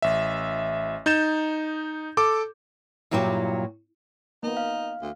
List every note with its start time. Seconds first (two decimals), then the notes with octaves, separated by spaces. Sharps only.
0.02 A1 E5
1.06 D#4 G6 A6 E7
2.17 A4 D6
3.11 G2 A#2 F#3 E4 F#4 G4
4.43 A#3 B3 D#4
4.57 F5
5.01 D2